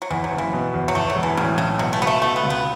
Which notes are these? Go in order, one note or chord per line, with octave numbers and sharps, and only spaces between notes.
F#3
E2 E3
F#3
F#1
E3
B2
E2
F#3
E2 A3
F#3
E1
E3
A2 C#3
B1 C#3
B2 F#3
A3
C#2 B3
A3
B2 A3
B3
C#2
B3